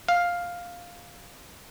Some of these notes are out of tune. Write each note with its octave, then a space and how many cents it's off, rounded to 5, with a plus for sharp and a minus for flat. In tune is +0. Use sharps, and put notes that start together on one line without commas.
F5 +5